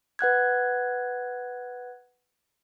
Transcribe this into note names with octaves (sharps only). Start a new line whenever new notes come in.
B4 F#5 F#6 G#6